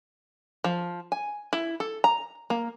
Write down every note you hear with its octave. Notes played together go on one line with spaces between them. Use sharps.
F3
G#5
E4
A4
A#5
A#3